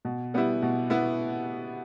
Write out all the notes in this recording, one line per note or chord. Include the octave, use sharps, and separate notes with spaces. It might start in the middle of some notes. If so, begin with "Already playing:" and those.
B2
G3 B3 E4
B2
B3 E4